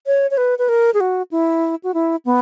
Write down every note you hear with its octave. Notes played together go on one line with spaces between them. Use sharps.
C#5
C#5
B4
B4
A#4
G#4
F#4
E4
F#4
E4
B3